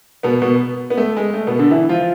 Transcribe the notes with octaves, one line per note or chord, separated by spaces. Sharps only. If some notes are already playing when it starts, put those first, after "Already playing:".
B2 B3
B2 B3
B3
A3
G#3
A3
B2 B3
D3 D4
E3 E4
F3 F4